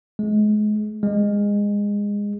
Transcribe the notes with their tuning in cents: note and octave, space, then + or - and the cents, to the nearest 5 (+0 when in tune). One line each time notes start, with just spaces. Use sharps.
G#3 +30
G#3 -20